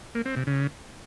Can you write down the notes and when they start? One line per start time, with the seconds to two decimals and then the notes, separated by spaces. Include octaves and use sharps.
0.15 A#3
0.26 C4
0.36 C3
0.47 C#3